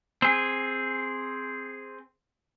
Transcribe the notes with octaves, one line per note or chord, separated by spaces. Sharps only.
C4 G#4